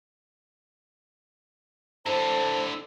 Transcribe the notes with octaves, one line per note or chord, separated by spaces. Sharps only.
D3 E4 A4 C5 A5